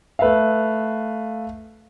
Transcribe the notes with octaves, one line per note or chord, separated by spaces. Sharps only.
A3 B4 E5 F5